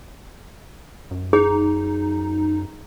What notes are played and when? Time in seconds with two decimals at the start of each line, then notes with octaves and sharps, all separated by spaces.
1.11 F#2
1.33 D#4 G#4